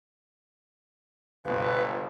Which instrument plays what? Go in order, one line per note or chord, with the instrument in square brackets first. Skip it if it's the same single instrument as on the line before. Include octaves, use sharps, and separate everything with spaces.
[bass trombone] G1 [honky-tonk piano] C#2 B2 [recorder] B4